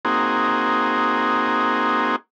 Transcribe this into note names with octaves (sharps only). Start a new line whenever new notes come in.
A#3 C4 D#4 F#4 G#4